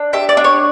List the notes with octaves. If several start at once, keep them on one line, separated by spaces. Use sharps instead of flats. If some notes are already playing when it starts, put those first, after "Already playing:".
Already playing: D4
G4 E5
D5
D4
C#5